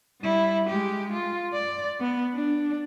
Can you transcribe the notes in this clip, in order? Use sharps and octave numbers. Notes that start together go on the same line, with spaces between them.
G3 E4
G#3 G4
F4
D5
B3
D4